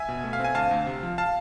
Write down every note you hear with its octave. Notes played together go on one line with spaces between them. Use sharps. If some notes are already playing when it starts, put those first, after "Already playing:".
Already playing: E5 G#5
B2
A3
F5
C4
G#5
D2 F5 A5
D2
C3
F3
F5 A5